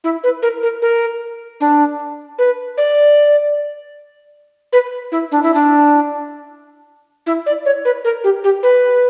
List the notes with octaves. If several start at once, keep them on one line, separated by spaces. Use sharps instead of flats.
E4
B4
A#4
A#4
A#4
D4
B4
D5
B4
E4
D4
E4
D4
E4
D5
C#5
B4
A#4
G4
G4
B4